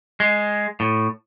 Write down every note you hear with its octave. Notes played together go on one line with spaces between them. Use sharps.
G#3
A2